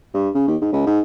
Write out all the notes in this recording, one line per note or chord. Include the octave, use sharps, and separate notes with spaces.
G2
C#3
D#2
G#2
C#2
G#2